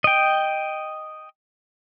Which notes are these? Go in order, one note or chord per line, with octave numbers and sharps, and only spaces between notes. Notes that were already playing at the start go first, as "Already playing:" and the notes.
D#5 G5